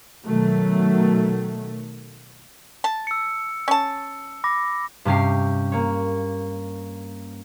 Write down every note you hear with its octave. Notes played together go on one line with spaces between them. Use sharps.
B2 D#3 F#3 A3
A5
E6 C#7
C#4 A5
B5 D6 A#6
G2 C3 C#4 G4 C7
A#3 C#5